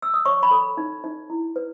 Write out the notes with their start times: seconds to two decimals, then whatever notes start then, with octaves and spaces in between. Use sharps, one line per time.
0.02 E6
0.14 D#6
0.25 C#5 C#6
0.43 B5
0.51 A4
0.77 D#4
1.04 D#4
1.30 E4
1.56 B4